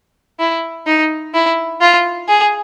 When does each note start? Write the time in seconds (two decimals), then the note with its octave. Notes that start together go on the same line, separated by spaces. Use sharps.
0.40 E4
0.86 D#4
1.34 E4
1.81 F4
2.28 G#4